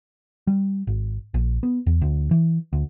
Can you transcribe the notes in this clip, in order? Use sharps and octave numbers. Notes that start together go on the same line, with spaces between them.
G3
G#1
A#1
B3
E2
D2
E3
D2